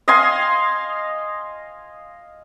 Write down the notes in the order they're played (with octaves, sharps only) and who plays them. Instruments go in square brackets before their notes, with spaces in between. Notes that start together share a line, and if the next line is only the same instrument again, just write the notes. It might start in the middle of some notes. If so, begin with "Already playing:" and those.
[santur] D#5 F5 G#5 C6